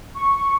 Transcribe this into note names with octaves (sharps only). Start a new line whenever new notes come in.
C#6